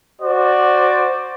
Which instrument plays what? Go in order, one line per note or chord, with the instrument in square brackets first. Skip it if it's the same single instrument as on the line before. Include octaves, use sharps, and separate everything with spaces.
[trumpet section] F#4 C5 D5